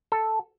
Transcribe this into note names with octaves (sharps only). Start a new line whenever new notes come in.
A4